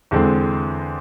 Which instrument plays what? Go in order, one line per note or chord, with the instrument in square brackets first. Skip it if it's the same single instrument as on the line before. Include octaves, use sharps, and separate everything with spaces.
[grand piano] E2 D3 G#3 C4